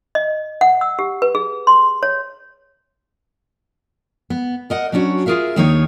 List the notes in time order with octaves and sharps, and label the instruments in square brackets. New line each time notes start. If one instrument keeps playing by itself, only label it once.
[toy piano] D#5
F#5
E6
G4
B4
G#4
C6
C#5
[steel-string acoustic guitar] B3
A#4 D#5 F#5
F#3 C#4 D4 F#4 C#5
F4 G#4 A#4 E5 F5
D#2 D#3 A#3 D4 D#4 C#5